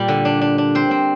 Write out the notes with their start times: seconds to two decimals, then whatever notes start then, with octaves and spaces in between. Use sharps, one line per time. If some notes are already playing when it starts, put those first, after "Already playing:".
Already playing: A#2 G3
0.08 D3
0.25 D4
0.42 D4
0.58 D4
0.75 C4 C5
0.91 C4